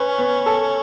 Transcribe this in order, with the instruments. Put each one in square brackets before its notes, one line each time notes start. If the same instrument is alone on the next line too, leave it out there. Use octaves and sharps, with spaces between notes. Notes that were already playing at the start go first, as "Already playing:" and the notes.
Already playing: [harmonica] C#4 [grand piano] B4
[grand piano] B3
A4